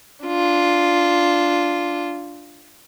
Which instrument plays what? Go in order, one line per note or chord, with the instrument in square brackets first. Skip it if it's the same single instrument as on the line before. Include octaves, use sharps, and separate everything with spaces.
[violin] D4 F4